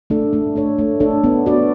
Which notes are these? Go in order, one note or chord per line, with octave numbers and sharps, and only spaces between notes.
A3 D4 A4
A3
D4 A4 C#5
A3
D4 A4 C#5
B3
F#4 B4 D5